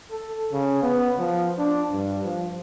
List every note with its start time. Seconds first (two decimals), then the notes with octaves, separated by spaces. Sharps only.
0.11 A4
0.52 C#3
0.82 B3
1.19 F3
1.59 D4
1.92 G2
2.24 F3